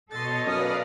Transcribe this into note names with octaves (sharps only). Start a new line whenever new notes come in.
B2 A4 C#5 D#5 C6 A6
F#2 B4 D5 F5 D#6 F6